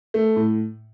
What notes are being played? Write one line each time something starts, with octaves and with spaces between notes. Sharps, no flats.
A3
A2